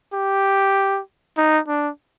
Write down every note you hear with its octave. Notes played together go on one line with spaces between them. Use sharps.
G4
D#4
D4